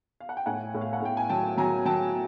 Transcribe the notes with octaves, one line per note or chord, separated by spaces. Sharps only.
F5
F#5
G5
A2 F#5 G#5
A2
F5
F#5
A2 G5
G#5
F#3 G5 A5
F#3 G#5 A#5
F#3 G5 A5